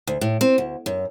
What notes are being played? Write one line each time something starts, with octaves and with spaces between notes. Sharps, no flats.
D2
A2
C4
D2
F#2